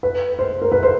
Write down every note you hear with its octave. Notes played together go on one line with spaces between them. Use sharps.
B4
C5
A#4
B4
C5